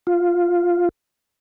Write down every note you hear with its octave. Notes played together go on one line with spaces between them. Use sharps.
F4